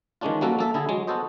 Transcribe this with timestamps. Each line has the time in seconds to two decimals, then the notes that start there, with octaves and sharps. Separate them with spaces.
0.21 D#3 E3 G#3 C#4 D4 F4
0.41 F#3 G3 A#3 C#4 F#4 A4
0.59 A#3 A4 E5
0.74 D3 E4 G#4 A4
0.89 F#3 G#3
1.07 B3 F#4 A4 C5 D#5